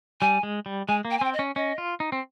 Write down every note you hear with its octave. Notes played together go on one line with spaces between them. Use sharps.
G3 G#5
G#3
G3
G#3 G#5
A#3
G5
G#5
C4 G5
D#5
C#4
C#4 D#5
F4
D#4
C4